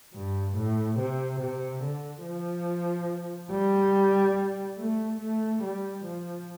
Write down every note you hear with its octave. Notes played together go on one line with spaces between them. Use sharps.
G2
A2
C3
C3
D3
F3
G3
A3
A3
G3
F3